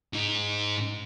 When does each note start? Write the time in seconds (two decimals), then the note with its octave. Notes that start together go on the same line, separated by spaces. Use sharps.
0.13 G#2 D#4